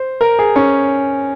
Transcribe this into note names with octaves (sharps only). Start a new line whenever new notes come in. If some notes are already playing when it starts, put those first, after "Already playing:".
Already playing: C5
A#4
G#4
C#4